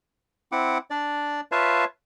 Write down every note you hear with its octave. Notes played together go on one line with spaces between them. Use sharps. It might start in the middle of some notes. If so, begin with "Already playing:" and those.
C4 E4 F#5 D6
D4 D5
F4 B4 C#5 E5 F5 A5